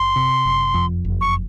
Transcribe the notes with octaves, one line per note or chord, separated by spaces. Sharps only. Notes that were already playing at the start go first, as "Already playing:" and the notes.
Already playing: F#1 C6
C3
F#1
F2
F#1
C#6